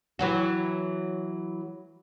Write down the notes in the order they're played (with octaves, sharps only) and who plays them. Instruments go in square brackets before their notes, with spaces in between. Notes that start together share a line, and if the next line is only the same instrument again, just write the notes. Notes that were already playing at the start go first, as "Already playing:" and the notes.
[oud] E3 F#3 F#4